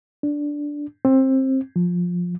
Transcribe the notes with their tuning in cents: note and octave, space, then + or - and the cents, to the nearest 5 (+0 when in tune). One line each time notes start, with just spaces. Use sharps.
D4 -5
C4 +20
F3 +15